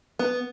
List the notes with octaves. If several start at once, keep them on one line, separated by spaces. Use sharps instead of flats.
B3